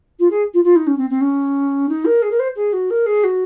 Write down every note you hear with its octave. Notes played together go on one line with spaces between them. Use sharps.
F4
G#4
F4
F4
D#4
C#4
C4
C4
C#4
D#4
A#4
G#4
A#4
C5
G#4
F#4
A#4
G#4
F#4